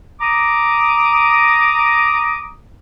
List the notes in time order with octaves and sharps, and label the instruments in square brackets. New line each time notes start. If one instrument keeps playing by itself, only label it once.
[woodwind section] A#5 D6 D#6